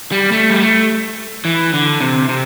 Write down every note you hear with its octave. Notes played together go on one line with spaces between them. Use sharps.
G3
A3
G3
A3
E3
D3
C3
C3